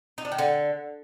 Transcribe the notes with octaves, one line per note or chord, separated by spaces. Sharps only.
D#4
D4
D#3
D3